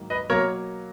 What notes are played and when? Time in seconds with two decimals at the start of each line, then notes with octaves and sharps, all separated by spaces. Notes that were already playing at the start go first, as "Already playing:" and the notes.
Already playing: G#2 D#3 F#3 A#3
0.10 B4 D#5
0.30 B2 F#3 A#3 A#4 C#5